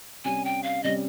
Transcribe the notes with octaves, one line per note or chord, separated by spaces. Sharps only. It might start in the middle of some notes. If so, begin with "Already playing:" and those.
C3 G3 C#4 G#5
G5
F5
C3 G3 C#4 D#5